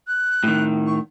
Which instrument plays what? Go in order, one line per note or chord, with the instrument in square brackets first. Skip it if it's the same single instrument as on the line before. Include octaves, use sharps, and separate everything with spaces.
[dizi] F#6
[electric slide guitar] A2 D#3
[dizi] C#6